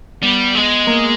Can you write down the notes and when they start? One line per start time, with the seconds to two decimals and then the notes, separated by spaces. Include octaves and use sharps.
0.22 G3 B3
0.55 G#3
0.87 A#3